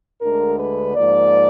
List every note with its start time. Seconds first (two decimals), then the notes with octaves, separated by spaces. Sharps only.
0.21 D2 D3 G#3 A#4
0.58 B4
0.95 G#2 F3 A#3 D5